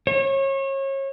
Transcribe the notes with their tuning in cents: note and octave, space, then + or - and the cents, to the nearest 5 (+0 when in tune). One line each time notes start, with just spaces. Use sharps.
C#5 -30